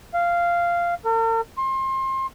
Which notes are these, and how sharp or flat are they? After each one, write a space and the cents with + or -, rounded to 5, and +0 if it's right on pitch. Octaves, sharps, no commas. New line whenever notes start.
F5 -10
A#4 -45
C6 +30